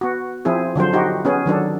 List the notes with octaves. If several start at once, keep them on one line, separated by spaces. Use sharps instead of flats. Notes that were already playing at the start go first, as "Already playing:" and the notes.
B3 F#4
F3 C4 E4 G#4
D3 F3 F#3 C5
D#4 F#4 G4
B3 C#4 G#4
D#3 F#3 D4 A4